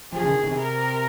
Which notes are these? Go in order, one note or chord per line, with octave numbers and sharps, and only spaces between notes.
F3 G#4
C#3
D#3
C3
A#4